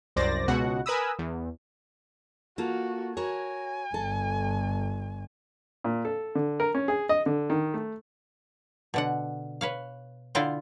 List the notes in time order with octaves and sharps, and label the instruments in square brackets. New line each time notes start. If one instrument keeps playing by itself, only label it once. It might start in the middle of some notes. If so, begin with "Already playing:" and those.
[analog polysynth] C2 F#2 C5 D5 A6 A#6
C#2 B2 F#4 F#5
A#4 B4 G#5 B5 D#6 E6
E2
[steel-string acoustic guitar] A#3 F4 A4 [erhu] F#4
[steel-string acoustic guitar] F#4 A#4 C#5 [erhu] G#5
[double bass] G1 [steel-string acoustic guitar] A4
[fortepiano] A#2
A4
D3
A#4
C#4
G#4
D#5
D3
D#3
A3
[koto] B2 D3 F#5
B4 C#5 F5
D3 E4 F4 F5 G5